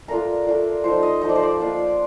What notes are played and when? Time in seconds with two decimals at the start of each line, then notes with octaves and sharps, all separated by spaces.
0.08 A3 D4 F4 A#4
0.46 A3 D4 F4
0.84 F3 A3 D#4 C5
1.03 D#5
1.21 F3 A3 D#4 D#5
1.29 D5
1.36 C5
1.43 D5
1.59 A#3 D4 F4